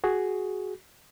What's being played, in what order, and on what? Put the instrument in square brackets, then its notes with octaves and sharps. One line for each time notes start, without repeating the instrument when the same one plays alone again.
[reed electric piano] F#4 G#4